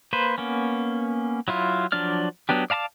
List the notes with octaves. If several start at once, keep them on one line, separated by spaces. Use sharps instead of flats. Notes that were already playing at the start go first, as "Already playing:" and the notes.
A#3 B4 C5
A#3 B3 C#4
F#3 E4 F4
F3 F#3 D4 D5 F6
F#3 B3 D4 G4
D5 F5 A5 A#5 D6